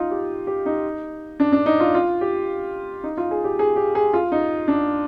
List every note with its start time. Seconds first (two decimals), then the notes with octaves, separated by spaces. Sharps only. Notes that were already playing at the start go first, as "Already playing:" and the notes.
Already playing: D#4 F4
0.11 G4
0.47 G4
0.66 D#4
1.40 D4
1.52 D4
1.66 D#4
1.80 F4
1.95 F4
2.21 G4
3.03 D#4
3.17 F4
3.31 G#4
3.44 G4
3.59 G#4
3.76 G4
3.95 G#4
4.13 F4
4.32 D#4
4.68 D4